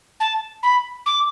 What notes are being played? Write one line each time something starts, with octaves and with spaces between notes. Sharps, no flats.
A5
B5
D6